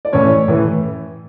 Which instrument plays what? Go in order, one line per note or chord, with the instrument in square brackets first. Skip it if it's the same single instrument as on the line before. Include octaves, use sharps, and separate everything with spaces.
[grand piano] D5
A2 E3 C#4 C#5
A2 E3